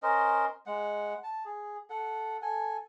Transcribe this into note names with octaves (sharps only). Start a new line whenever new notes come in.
C#4 A#4 C5 D#5
G#3 F#5
A5
G#4
A4 F#5
A4 G#5